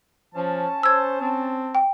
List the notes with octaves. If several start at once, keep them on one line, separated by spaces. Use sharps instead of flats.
F3 C#4 A5
C5 E6 G#6
C4
G5